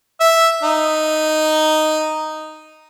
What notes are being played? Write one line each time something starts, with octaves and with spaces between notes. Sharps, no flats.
E5
D#4